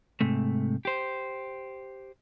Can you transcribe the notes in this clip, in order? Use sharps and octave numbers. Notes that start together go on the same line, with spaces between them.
G#2 C3 A3
G4 C5